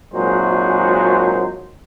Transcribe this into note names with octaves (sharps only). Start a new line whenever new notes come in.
G#1 A#2 F#3 G#3 F#4 C5